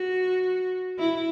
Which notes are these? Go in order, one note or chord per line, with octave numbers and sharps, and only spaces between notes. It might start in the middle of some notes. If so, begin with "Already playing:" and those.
Already playing: F#4
E4